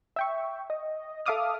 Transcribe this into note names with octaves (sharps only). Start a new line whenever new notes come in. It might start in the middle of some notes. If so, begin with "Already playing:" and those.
E5 G5 C#6
D#5
A4 E5 F5 D6 D#6 F6